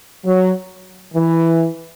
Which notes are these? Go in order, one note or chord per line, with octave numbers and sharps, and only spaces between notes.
F#3
E3